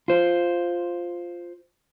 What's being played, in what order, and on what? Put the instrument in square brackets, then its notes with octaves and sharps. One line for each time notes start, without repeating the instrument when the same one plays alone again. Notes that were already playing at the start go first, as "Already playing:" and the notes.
[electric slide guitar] F4 C5